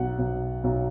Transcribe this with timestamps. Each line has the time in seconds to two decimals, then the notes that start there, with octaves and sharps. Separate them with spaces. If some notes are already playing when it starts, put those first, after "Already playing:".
Already playing: B1 F#5
0.19 B1
0.64 B1